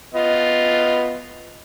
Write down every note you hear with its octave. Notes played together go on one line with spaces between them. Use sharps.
B3 F4 D#5